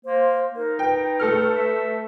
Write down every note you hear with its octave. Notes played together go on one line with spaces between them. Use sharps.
A#3 C5
D#4 A#4
B4 G5
A3 A4 F6
E5